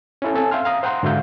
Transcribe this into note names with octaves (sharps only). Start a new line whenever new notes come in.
C#4 E4 A4
C4 A4 G#5
E5 F5 G5 C6 F6
F5 A#5 D#6
C5 F#5 G5 A#5 C6
G#2 D3 F#4 E5 F5 G6